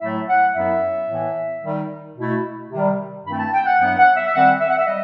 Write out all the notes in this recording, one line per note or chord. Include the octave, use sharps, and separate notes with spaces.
A2 F#3 A3 E4 E5
F#5
F#2 F#3 B3 E4 E5
A2 E3 B3
D#3 G3 D#4
B2 A3 E4
C3 D#3 G3
G2 D#3 A3 C4 E4 B5
G5
A5
G5
F#5
G2 F#3 B3 E4 F#5
F#5
E5
E5
D#3 G3 C4 F#5
E5
F#5
E5
G3 D#5